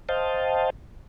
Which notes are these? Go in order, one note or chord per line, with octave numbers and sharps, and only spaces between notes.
C5 D#5 F5 G5 A5